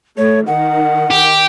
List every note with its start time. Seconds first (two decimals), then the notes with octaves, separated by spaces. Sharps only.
0.18 A3 C#5
0.47 D#3 F#5
1.10 G4